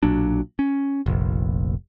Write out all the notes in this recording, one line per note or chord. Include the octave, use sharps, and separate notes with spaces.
B1 A#2 F#3 D4
C#4
F1 A#1